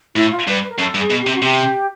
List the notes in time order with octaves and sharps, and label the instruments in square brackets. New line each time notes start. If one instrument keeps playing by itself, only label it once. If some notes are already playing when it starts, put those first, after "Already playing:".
[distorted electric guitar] A2 [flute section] E4
[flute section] F4
[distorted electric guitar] G2 [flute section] B4
[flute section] B4
A#4
[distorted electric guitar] F#2 [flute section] A4
[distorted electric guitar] G2
[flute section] G#4
[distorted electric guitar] B2
[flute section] G4
[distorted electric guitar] C3
[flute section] F#4
[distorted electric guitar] C3 [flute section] G4